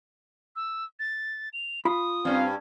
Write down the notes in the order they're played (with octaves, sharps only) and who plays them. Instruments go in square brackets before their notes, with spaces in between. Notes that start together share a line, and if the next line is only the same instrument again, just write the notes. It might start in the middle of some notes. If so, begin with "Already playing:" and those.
[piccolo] E6
A6
F7
[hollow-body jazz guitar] F4 B5 [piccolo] D#6
[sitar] G2 C#4 [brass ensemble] C4 F5